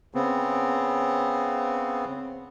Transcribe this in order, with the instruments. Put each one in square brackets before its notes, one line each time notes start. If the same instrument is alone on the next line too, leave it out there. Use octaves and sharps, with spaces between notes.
[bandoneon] C#3 B3 C4